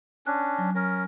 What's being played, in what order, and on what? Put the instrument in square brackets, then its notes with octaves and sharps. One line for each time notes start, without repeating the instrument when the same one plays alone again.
[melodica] C#4 D4 [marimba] F#6
[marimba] F#3
[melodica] C#4 A#4